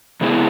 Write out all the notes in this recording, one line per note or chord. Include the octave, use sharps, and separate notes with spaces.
C#3 G#3 B3 E4 G#4